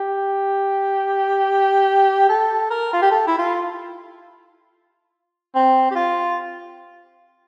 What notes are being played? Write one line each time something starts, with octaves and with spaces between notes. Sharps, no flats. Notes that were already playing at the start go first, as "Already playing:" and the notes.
Already playing: G4
A4
A#4
F4
G4
A4
E4
F4
C4
G4
F4